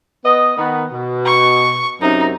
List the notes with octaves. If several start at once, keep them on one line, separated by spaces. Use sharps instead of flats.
B3 D#5
D#3 B3
B2
C#6
F#2 C3 D#4